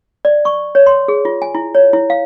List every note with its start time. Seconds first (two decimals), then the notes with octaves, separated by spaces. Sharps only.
0.25 D5
0.45 C#6
0.75 C#5
0.87 C6
1.08 G#4
1.25 F4
1.42 G#5
1.55 E4
1.75 C#5
1.93 E4
2.10 F5